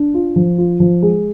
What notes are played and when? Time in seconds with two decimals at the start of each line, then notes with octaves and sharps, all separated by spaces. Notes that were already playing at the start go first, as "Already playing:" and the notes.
Already playing: D4
0.14 F4
0.36 F3
0.58 F4
0.80 F3
1.02 G#3